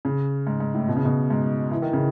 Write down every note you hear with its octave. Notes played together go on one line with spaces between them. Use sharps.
C#3
G#2
G#2
A2
B2
C#3
B2
G#2
E3
D#3
C#3